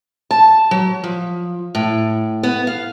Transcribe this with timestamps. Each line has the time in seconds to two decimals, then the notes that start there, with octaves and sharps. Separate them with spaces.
0.31 A5
0.71 F#3
1.04 F3
1.75 A2
2.43 B3
2.67 F5